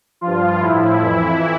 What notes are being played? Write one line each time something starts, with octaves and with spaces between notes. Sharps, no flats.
G2 F3 F4
A2 F3 E4
F2 E3